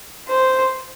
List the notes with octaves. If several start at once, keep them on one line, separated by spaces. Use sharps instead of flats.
C5